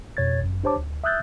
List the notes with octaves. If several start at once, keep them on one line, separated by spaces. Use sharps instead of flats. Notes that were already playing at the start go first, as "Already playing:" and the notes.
F2 B2 C#5 G#6 A6
G1 F#2
D4 G4 C5 C#5 A5 D6
D2
E5 D#6 E6 F#6 G6 A6